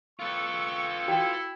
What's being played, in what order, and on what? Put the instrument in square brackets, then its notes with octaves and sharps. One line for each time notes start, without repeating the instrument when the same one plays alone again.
[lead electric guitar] F4 B4 [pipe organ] A4 [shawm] C#6
[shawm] E4 [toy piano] F#4 G5